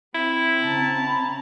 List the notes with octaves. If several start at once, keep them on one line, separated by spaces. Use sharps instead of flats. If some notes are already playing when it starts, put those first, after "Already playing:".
C4 E4
C#3 A5 A#5
B5